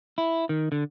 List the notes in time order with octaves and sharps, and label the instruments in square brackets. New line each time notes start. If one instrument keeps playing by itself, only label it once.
[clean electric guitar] E4
D#3
D3